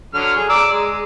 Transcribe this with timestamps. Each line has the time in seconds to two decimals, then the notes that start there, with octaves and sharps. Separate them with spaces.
0.14 D3 F#3 F6
0.36 G#4
0.49 D5 A#5 E6
0.72 G#3